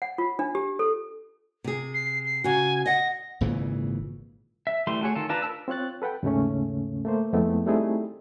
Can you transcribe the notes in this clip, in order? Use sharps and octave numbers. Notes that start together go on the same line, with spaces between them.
F#5
F4
D4
G4
A4
C3 G#4
C7
C7
C#3 F#4 G#5
D#5 F#5 A#6
G#1 A#2 C#3 E3
E5
E3 G3 A3 C6
A3 F#4 G#4 C#5
D#3 F4 A4
D4 F4 B4 A5 A#5
A#4 B4 A5 E6
C4 F4 C#5 F#6 A6
A4 B4 F#5 G5
D#2 G#2 C#3 A3 C#4
A3 A#3 C5
F2 G#3 A3 B3 C4 E4
G3 A3 C4 D#4 E4 G#4